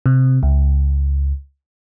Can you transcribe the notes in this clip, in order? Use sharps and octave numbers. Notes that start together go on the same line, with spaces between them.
C3
C#2